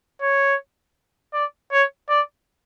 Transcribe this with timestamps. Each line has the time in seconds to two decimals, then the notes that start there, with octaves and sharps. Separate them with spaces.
0.22 C#5
1.33 D5
1.72 C#5
2.09 D5